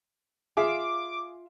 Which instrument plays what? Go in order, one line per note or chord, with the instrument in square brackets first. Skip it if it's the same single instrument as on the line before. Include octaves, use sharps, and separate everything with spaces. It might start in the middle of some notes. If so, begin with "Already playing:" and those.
[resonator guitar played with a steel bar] F4 E5 F5 [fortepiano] G#4 [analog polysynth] D6